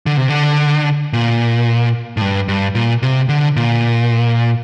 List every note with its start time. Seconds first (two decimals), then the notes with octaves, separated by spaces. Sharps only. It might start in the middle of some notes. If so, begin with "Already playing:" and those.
0.06 D3
0.17 C3
0.29 D3
1.13 A#2
2.17 A2
2.21 G2
2.48 G2
2.75 A#2
3.02 C3
3.29 D3
3.56 A#2